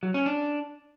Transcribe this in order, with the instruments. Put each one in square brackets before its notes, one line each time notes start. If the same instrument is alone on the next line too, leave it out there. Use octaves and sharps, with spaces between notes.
[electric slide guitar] F#3
C#4
D4